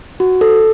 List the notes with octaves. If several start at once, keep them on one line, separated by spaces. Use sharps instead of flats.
F#4
A4